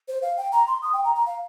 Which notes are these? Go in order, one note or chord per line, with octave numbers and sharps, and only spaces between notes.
C5
F5
G5
A#5
C6
D#6
G5
A#5
A#5
F5